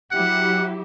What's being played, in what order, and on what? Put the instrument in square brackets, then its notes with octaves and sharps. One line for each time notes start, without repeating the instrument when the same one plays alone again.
[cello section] F#3 E4 G4 [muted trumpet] F#5